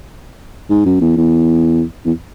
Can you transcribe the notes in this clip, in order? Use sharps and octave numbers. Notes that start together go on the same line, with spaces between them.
G#2
F#2
E2
E2
E2